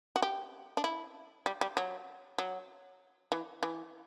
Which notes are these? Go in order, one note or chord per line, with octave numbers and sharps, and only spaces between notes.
F#4
G4
D4
E4
G3
G3
F#3
F#3
E3
E3